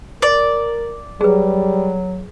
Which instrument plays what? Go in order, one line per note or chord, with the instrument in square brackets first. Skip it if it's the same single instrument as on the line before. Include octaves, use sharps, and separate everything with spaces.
[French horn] A#4 [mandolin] D5
[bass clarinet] F#3 [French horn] G3 [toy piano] G#4 B4